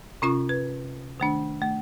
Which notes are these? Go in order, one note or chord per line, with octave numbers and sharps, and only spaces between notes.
C3 C#4 F4 C#6
B4
D#3 A3 D4
A3